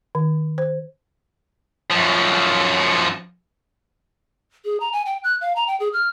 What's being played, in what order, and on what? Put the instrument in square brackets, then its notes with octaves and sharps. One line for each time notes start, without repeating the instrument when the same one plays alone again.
[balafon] D#3
C5
[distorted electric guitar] F#2 F3
[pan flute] G#4
A#5
G#5
G5
F#6
F5
A#5
G5
G#4
F6